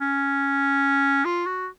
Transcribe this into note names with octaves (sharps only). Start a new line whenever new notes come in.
C#4
F4
F#4